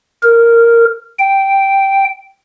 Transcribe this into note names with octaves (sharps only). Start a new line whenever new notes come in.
A#4
G5